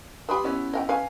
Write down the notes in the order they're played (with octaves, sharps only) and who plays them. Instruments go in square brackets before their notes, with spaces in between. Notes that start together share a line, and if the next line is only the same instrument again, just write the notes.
[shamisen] G4 B4 [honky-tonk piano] B5 C6 D#6
[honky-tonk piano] B3 C#4 E4
[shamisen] D#5 F5 G5
[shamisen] C#4 B4 [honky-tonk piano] F5 G#5